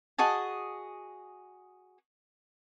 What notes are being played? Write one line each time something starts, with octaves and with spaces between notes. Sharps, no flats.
F#4 G#4 D#5 A5